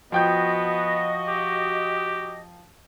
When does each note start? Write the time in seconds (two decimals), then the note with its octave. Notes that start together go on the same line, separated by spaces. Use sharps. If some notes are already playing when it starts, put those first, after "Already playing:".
0.12 F3 B3 F#4 D#5 G5 G6
1.28 G4